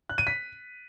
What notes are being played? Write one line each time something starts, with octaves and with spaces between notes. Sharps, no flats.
F#6
D#7
B6